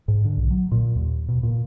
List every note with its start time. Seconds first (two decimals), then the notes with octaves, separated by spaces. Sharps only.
0.08 G#2
0.25 D3
0.37 B1
0.51 F#3
0.71 A#2
0.95 D#2
1.28 B2
1.43 A#2